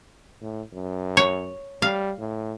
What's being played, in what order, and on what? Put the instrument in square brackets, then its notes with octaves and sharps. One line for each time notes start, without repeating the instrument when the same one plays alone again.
[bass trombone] A2
F#2
[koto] C#5
[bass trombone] G3 [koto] F5
[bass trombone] A2